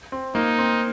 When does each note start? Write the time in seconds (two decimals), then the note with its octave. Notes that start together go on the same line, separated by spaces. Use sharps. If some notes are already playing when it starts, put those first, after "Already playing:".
0.12 C4
0.35 A#3 D#4
0.58 C4